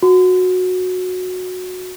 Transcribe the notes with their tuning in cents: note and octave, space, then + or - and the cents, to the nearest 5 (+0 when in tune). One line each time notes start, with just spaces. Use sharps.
F#4 -15